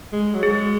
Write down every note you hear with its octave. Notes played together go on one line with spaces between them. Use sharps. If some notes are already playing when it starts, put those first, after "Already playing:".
G#3
F#3
G#3 G#4